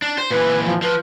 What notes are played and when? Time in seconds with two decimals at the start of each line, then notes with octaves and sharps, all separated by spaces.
0.02 D4
0.18 C5
0.31 A#2 E3 B4
0.66 F3
0.82 F3 B4